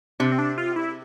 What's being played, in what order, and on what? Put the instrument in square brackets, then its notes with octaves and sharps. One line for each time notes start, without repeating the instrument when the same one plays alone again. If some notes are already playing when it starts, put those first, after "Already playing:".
[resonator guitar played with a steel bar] C3 [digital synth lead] D4
[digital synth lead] C4
D4
F4
E4